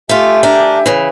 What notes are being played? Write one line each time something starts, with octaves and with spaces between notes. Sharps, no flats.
A3 F4 G4 E5 G#5
D4 A#4
C#3 E3